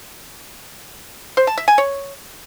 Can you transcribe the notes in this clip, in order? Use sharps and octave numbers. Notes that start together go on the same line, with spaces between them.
C5
A5
E5
G#5
C#5